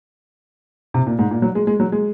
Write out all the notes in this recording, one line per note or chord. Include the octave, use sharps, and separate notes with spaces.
C3
A#2
G#2
A#2
F#3
G#3
G#3
F#3
G#3